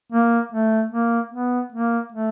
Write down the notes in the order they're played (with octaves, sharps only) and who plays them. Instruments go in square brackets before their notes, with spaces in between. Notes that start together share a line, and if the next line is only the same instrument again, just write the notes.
[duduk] A#3
A3
A#3
B3
A#3
A3